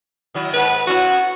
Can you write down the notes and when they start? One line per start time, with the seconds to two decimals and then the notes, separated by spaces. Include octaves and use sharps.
0.34 D#3 F#3 E4
0.53 G#2 B4
0.87 B3 C#4 E4 F#4